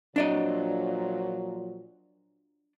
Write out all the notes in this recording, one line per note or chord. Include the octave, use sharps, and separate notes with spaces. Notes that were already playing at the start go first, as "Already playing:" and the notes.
A#2 F3 F#3 D4 D5 D#5